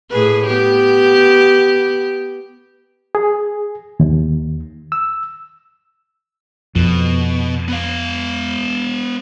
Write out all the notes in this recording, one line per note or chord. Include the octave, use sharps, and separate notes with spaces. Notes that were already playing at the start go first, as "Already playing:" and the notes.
A2 G#4 B4
B3 G4
G#4
D#2
E6
F2 B2
B3 F5